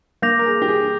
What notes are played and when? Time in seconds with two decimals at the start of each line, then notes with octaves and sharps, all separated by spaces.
0.22 A#3 D6 G6 A#6 F7
0.39 A#4
0.46 G#4
0.62 G4
0.68 G#4